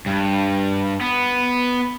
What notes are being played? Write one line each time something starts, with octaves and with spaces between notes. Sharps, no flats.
G2
B3